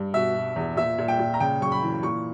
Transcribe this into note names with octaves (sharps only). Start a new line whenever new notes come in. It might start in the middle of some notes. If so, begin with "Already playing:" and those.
Already playing: G2
B2 E5
B2
E2
A#2 E5
A#2
G5
A#2
A#5
C#3 G5
F#2 C#6
B5
E3
A#2 C#6